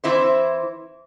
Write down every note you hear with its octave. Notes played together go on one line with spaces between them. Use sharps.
E3 C4 E4 C5 E5